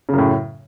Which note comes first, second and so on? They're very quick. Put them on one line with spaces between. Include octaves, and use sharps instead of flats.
C#3 F#2 A2